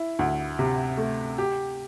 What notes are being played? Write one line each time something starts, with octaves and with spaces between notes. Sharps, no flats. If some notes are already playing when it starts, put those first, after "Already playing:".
Already playing: E4
D2
C3
A3
G4